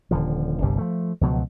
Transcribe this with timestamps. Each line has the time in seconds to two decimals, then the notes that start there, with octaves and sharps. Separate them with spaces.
0.11 D#1 D3 F3
0.62 G1 C2 G2 G3
0.78 F3 A3
1.21 C#2 B2 F3 F#3